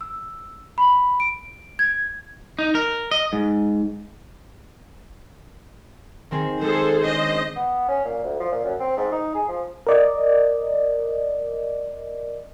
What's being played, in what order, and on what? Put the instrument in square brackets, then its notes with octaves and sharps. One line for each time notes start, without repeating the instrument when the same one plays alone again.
[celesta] E6
B5
D7
G#6
[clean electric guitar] D#4
A#4
D#5
G#2
[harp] D#3 C4 G#4
[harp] G#3 [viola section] G#4 A4 C5
[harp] C#4 D4 [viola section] C5 D#5
[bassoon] B3
C#4
A#2
D2
F3
A#2
F#2
C4
G#2
D#4
G#4
F3
[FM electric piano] A#4 D5 D#5